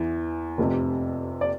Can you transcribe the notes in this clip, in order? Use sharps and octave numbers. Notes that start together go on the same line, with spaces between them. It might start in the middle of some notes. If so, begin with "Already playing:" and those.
Already playing: E2 E3
F1 F2 C3
D5